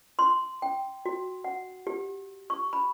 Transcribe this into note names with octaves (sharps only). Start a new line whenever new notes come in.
C6
G5
F#4
F#5
G4
C#6
B5